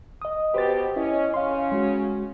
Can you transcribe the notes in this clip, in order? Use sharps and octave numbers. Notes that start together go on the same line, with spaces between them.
D#5 D#6
B2 G4 B4 C5 A6
C#4 E4 D#5
C#3 C#4 F5 C6
G#3 F#4